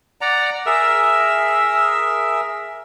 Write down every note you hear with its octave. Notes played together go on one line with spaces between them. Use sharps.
D5 F#5 A#5
G#4 A#4 E5 E6